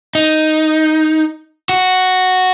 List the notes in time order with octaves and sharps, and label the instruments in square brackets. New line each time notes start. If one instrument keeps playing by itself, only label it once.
[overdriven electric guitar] D#4
F#4